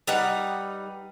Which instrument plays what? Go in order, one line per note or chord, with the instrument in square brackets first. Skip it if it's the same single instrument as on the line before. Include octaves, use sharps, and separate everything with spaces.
[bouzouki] G3 D#4 B4 F#5